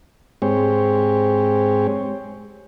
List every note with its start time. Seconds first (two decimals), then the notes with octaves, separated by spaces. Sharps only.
0.42 G#2 G#3 C4 G4 C#5